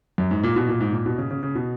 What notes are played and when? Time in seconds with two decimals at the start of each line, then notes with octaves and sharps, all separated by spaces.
0.18 F#2
0.31 G#2
0.43 A#2
0.56 B2
0.68 A#2
0.81 G#2
0.92 A#2
1.06 B2
1.18 C#3
1.31 C#3
1.43 C#3
1.55 B2